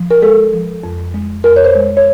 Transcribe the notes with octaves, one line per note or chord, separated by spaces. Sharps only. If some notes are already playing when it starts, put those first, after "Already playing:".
Already playing: F3
A#4
G#3 A4
F3
F2
G#3
F2 A#4
C#5
C5
G#3
C#5